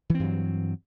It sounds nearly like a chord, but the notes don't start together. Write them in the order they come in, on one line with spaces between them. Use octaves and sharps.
E3 C4 G2 F#3